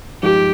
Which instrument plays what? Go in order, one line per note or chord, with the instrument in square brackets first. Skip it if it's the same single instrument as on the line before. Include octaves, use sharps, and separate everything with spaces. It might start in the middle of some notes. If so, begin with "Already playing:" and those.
[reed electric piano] G2 F3 G#3 D#4 [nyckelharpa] G4